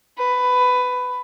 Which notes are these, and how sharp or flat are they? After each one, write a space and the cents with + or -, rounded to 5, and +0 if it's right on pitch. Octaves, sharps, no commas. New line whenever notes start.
B4 +15